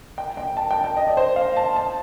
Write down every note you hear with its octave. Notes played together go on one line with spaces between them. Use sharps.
G5
G5
A5
G5
G5
D#5
D5
C5
F5
A5
A5